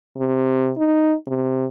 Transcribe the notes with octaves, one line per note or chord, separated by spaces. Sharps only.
C3
D#4
C3